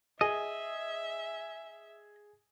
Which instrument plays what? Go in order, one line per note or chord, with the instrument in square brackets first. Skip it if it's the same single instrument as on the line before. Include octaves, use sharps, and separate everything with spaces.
[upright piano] G#4 [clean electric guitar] D#5 [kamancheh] E5